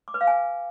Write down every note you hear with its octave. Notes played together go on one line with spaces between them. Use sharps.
D6
B4
F5
G#5